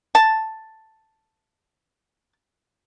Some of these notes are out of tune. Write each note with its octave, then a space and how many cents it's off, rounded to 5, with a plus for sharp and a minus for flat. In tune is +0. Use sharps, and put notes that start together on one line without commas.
A5 +5